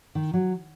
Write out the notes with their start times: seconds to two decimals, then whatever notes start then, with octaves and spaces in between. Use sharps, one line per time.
0.15 D#3
0.34 F#3